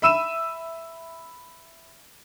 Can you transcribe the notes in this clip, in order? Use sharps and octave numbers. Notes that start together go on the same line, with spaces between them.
E5 B5 E6 D#7 E7